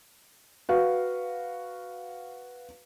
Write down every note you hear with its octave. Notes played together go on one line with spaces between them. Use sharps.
F#4 B4 F5